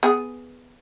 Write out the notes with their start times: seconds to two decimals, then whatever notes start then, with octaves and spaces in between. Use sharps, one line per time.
0.03 B3 G#4